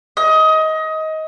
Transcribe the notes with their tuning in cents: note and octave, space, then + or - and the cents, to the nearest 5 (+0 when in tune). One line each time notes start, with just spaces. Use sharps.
D#5 +20